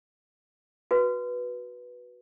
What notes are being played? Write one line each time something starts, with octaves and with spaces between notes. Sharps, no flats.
F#4 B4